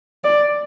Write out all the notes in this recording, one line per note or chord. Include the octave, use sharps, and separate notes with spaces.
D5